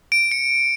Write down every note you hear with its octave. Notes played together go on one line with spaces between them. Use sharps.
D7
C#7